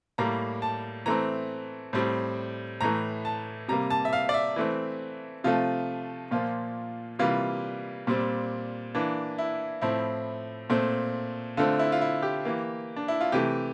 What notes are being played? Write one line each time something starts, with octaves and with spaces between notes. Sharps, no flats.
A2 G3 A#3 A#5
A5
E3 A3 C4 A#5
A2 G3 C4
A2 E3 A3 A#5
A5
C3 G3 A#3 A#5
A5
E5
F5
D5
E5
E3 A3 C4
C3 F3 A3 F4
A#2 F3 A#3 F4
C3 E3 G3 A#3 F4
A#2 G3 C4
E3 A#3 D4
E4
A2 F3 C4 E4
A#2 A3 C4
D3 A3 C4 F4
E4
F4
E4
G4
E3 A#3
D4
E4
F4
C3 E3 A3 G4